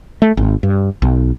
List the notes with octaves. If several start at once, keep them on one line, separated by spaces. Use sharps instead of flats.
A3
G#1
G2
B1